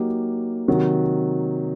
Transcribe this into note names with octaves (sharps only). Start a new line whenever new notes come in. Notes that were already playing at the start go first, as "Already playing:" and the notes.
Already playing: F#3 A#3 D#4 G4
C3 D#3 F#3